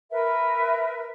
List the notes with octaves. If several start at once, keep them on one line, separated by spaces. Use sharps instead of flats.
A#4 B4 E5